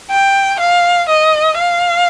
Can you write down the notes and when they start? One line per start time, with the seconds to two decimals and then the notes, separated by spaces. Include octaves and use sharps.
0.10 G5
0.60 F5
1.09 D#5
1.58 F5